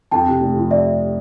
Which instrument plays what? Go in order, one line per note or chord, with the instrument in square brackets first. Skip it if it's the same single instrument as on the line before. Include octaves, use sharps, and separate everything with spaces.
[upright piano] F2 [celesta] G5 A5
[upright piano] C3
F1
F3
[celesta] D5 E5